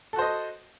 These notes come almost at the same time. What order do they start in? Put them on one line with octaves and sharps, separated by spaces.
A4 F#4 C5 D#5